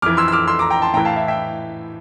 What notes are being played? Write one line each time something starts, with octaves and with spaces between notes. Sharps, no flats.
F2 E3 D6 F6
C6 E6
E6
D6 F6
C6 E6
A#5 D6
G5 A#5
A5 C6
A2 E3 G5 A#5
F5 A5
E5
E5 G5